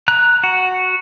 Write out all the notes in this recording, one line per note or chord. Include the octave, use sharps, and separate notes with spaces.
A#5 F#6
F#4